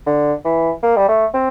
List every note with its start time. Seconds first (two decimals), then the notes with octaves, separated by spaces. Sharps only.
0.06 D3
0.45 E3
0.83 A#3
0.97 G3
1.08 A3
1.34 C4